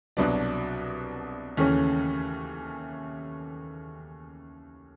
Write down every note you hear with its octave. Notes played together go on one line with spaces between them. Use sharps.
C2 B2 F#3 B3 D4
D#2 C#3 E3 A3 C#4